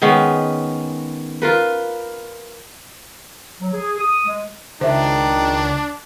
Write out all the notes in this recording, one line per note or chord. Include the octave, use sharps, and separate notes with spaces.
D#3 G#3 B3 C#4
F4 A#4 B4
F#3
G#4
D#6
G#3
C#2 D#3 D4 C5 E5